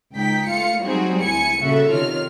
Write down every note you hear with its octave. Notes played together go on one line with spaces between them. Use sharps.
C#2 D#4 G5 B6
A3 F4 F5 C#7
F#3 G3 C4 D#4 F#4 G#4
D2 E4 G#5 C#7
A#2 C#3 F#4 A4 E5
C3 D#3 F4 C#5 F6